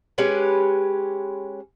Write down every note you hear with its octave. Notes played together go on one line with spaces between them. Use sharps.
G#3 C#4 G4 B4